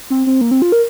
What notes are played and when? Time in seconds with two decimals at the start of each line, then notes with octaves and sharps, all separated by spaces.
0.10 C4
0.27 C4
0.41 A#3
0.51 C4
0.62 F4
0.72 A#4